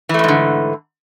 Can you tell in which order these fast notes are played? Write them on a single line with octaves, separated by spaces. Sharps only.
E3 A3 F2 G#2 D3